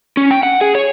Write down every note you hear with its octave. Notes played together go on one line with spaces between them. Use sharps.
C#4
G5
F#5
G#4
C#5